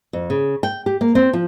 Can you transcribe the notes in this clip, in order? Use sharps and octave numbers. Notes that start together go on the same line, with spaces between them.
F2
C#3
G5
G4
A#3
C4
F3